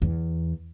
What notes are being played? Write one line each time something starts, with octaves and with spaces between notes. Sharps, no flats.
E2